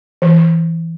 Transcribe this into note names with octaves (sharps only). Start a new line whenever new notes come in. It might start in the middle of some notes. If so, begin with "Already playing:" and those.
E3